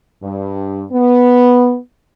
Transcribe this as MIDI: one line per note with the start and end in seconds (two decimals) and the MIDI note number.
0.22 0.84 43
0.91 1.78 59